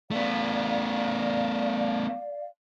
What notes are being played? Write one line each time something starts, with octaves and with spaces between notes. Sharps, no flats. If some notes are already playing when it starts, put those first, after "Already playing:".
A3 B3 D5 F5